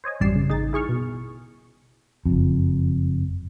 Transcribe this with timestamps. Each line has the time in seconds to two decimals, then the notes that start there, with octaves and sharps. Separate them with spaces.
0.04 C5 C#5 D#5 G#5
0.20 A1 F#2 G3 D5 C7 E7
0.35 C#3
0.49 A1 D#4 G#4 A6
0.73 E4 G#4 C#6 F6
0.89 B2
2.25 F#1 F2